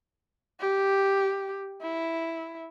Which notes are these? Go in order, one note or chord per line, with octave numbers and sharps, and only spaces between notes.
G4
E4